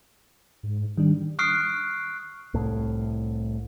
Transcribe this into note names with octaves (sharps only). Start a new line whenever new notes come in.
G#2
D#3 G3 D4
C#6 D#6 F6 F#6 C7 D7
C2 A2